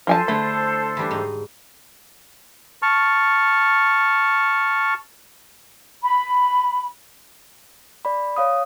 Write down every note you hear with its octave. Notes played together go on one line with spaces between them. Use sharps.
F3 A4 C5 G#5 A5
D3 A3 E4
E3 G3 D4
G#2 D#4
A5 C#6 F6
B5
D5 B5
C#5 F5 D#6